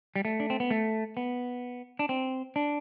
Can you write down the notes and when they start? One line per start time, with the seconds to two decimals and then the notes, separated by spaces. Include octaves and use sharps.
0.16 G3
0.25 A3
0.40 D4
0.50 C4
0.60 B3
0.71 A3
1.17 B3
1.99 D4
2.09 C4
2.56 D4